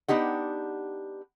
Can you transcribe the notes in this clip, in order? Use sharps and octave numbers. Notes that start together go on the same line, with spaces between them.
B3 D4 D#4 G4 F#5